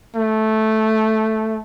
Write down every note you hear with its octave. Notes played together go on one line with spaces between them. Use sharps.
A3